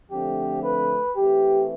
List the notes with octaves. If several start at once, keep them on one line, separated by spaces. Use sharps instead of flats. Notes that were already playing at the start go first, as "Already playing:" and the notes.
D3 F3 A3 C4 G4
B4
E3 A3 C4 G4